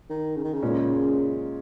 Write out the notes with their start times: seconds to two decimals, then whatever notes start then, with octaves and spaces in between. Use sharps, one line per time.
0.10 D#3
0.36 C#3
0.44 D#3
0.53 C#3
0.63 A#2 G#3 C#4